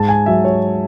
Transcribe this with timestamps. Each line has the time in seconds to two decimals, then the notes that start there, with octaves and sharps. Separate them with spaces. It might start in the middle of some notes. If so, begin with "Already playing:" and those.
Already playing: G#2 A5
0.09 G#5
0.26 F#3 E5
0.45 C#5